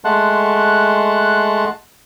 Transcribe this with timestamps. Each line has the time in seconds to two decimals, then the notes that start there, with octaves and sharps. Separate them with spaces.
0.05 G#3 A3 F#5 A5 C6 F#6